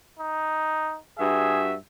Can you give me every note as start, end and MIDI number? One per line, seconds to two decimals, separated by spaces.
0.19 0.97 63
1.19 1.73 43
1.19 1.73 66
1.19 1.63 68
1.19 1.73 76